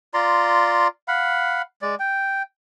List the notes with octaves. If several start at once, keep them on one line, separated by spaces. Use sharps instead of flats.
F4 D5 A#5 C6
F5 F#5 B5
G#3 D5
G5